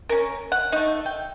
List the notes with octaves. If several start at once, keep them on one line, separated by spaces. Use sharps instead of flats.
C#4 A#4
F#5
A3 D#4
G5